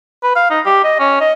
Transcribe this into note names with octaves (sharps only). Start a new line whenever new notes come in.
B4
F5
D#4
G4
D#5
C#4
D#5